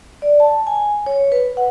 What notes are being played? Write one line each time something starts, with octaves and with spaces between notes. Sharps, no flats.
D5
A5
G#5
C#5
B4
F#5